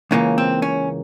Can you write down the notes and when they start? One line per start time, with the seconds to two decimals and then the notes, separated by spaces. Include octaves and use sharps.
0.11 C#2 C#3 E3 A#3 C#4
0.38 C4
0.62 C#4